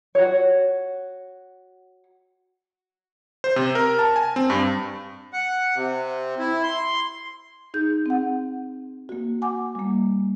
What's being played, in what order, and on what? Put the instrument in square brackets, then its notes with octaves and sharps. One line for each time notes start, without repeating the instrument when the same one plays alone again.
[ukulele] F#4 C#5
[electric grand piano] C5
C3
A#4
A5
G#5
C4
G2
[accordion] F#5
C3
E4
C6
[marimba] D#4 G#4 G6
C4 F#5
A#3 F#4
F#5 G#5 D6
G3 A#3